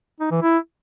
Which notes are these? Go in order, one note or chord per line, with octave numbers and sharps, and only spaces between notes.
D#4
E3
E4